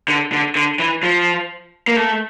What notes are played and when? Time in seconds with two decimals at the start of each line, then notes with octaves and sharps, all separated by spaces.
0.08 D3
0.32 D3
0.55 D3
0.79 E3
1.03 F3
1.88 A#3
1.96 A3